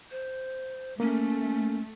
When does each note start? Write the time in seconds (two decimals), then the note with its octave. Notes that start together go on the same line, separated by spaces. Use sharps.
0.11 C5
1.00 A3 A#3 C#4